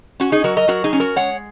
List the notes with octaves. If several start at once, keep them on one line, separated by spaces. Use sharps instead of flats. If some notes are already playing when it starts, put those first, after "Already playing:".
C#4 F#4
D#4 G#4
F#3 F#4 A#4
A#4 D#5
F#3 F#4 A#4
D#4 G#4
C#4
F#4 A#4
G#3 C#5 F#5